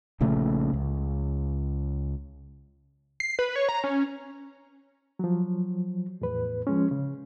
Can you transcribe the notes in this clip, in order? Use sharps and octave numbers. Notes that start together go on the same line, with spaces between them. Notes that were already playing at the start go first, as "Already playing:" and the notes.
A#1 A#2 C#3 A3
C#2
C7
B4
C#5
A#5
C#4
F3 F#3
E2 A2 B4
F3 G#3 C#4
C#3